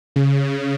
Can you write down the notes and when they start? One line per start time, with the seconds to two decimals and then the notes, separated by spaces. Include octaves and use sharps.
0.16 C#3